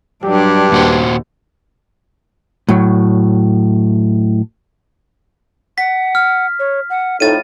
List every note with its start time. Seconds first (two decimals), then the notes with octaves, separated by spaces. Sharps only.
0.24 G2 F#3 D4 G4
0.72 D#2 A#2 F#4 C5
2.69 A2 F#3
5.78 F#5 B6
6.15 F6
6.59 C#5
6.90 F#5
7.20 F2 A2 D#4 A6 D#7